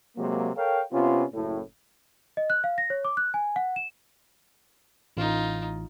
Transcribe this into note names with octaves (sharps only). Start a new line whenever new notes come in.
C3 F#3 G#3 A#3
A4 A#4 C#5 F5 G5
C3 B3 C#4 F4
F#1 A2
D#5
F#6
F5
A#6
C#5
D6
F#6
G#5
F#5
E7
A1 D#4 F4